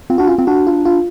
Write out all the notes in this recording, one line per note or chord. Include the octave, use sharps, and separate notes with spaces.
C4 F4
D4 F#4
C#4 F4
C4 F4
D4 F#4
F4
F4